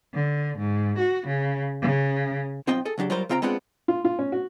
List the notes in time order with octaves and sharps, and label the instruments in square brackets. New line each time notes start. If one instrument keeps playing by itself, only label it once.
[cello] D3
G#2
F#4
C#3
C#3
[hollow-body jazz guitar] B1 C4 F4 D#5 G5
G#4 A4
C#3 F#3 D4 G4
F#3 G3 F4 A#4 C5
C#3 C4 F4 G5 A#5
G#3 B3 C4 D4 F4 F#5
[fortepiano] F4
F4
C#4
F#4